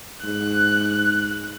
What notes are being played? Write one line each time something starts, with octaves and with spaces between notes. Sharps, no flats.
G#2 F#6